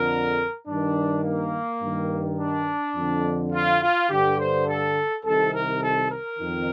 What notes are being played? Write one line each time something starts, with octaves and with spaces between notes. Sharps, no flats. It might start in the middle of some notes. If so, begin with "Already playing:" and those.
Already playing: F2 D3 A#4
G2 D#3 D4
A#3
G2 D#3
D4
F2 D3
F4
F4
G2 D3 G4
C5
A4
C2 C3 D#3 A4
A#4
A4
A#4
F2 D#3